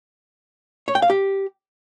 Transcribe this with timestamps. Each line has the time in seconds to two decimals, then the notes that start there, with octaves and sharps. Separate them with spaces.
0.88 C#5
0.95 G5
1.02 F5
1.10 G4